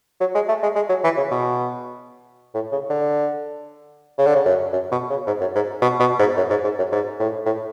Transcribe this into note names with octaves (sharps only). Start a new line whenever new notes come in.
F#3
G#3
A3
G#3
G#3
F#3
E3
C#3
B2
A2
C#3
D3
C#3
D3
C#3
F#2
F#2
B2
C#3
G#2
F#2
G#2
B2
B2
G#2
F#2
G#2
G#2
F#2
G#2
A2
A2